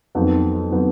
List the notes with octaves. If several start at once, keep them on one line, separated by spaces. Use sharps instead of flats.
F2 D#3 F#3 B3 D#4
D#3 F#3 B3 D#4